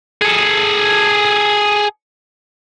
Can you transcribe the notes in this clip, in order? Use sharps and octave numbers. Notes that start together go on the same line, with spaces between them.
G#4 A4